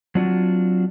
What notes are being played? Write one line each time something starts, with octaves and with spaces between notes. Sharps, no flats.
F#3 C4 D4 F4 F#4